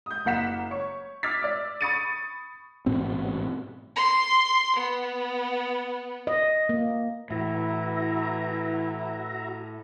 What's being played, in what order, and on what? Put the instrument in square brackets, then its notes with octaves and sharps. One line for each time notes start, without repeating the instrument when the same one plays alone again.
[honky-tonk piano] D#6 G6
F#1 A#3 F#5 B6 E7
C#5 C#6
D6 E6 F6 G#6 A6 B6
D5 D6
B5 C#6 D#6 A6 C#7 D#7
[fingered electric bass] A1 G#2 B2 C4
[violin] C6
B3
[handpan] D#5
A#3
[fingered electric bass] A2 [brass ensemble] E3 [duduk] E4 [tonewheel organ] F#4 E5 A#5